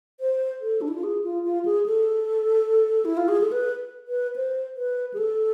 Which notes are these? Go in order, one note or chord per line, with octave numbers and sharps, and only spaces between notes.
C5
A4
D4
E4
F4
G#4
F4
F4
G#4
A4
E4
F4
G#4
A4
B4
B4
C5
B4
G#4
A4